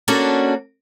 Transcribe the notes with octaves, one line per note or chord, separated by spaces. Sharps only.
A#3 C#4 D4 F#4 A4